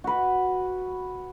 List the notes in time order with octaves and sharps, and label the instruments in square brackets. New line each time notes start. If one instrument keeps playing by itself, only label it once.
[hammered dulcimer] F#4 B4